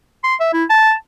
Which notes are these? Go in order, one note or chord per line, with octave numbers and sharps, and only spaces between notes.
C6
E5
E4
A5